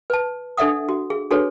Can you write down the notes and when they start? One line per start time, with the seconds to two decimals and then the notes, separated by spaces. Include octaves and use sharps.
0.10 B4 A5
0.57 D4 A4 D5 E5 F#5 D#6
0.89 F#4
1.10 G#4
1.31 D4 F#4 G#4 A4 B4 C#5